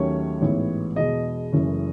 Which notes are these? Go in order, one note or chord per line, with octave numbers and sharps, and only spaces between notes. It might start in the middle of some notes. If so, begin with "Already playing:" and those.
Already playing: D#2 D#3 F#3 A3 C#4 C#5
A1 G#2 E3 B3
E2 B2 G#3 D#5
F#1 F#2 E3 A3 C#4